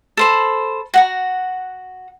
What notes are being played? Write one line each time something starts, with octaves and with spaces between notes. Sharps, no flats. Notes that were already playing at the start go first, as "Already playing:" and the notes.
A4 C5 B5
F#4 F#5 A#5